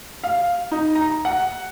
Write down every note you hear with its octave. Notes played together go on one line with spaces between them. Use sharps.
F5
D#4
A#5
F#5